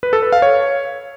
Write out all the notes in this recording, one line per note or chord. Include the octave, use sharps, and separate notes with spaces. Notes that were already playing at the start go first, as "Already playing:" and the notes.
B4
A4
B4
F5
C#5